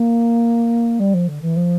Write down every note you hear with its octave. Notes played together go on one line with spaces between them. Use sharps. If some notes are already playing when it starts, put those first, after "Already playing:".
Already playing: A#3
G3
F3
D3
E3
F3